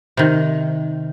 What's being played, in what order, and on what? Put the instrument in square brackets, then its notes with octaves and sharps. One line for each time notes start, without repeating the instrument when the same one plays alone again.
[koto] C3 D#3